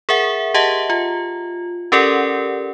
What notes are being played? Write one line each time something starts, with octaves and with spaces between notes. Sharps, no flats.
G#4 A#4 E5 F#5
G4 D#5 E5 F#5 A5
F4
C#4 G4 A4 A#4 D5 F#5